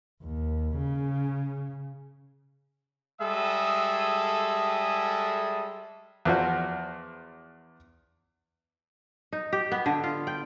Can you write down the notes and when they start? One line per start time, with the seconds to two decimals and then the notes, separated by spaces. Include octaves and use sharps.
0.23 D#2
0.77 C#3
3.21 G3 G#3 G#4 A4 E5 D#6
6.25 E2 F3 F#4
9.33 D#4
9.53 G4
9.72 B3
9.86 D3
10.04 F4
10.27 G5